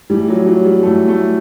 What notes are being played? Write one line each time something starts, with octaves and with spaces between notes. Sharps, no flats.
A2 E3 G3
F#3
F#3
G3
A2 E3 A3
A3